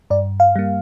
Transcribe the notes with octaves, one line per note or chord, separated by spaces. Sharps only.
G2 D5
F5
G3 A#3